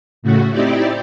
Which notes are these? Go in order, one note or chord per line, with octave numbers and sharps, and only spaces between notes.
A2 C#3 A3 F#4
C4 D#4 E4 G4 D5